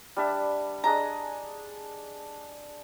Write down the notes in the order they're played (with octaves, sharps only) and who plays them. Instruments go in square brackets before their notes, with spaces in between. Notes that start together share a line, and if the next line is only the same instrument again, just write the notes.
[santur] G3 D4 E5
[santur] D4 G#4 D#5 [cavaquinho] A#5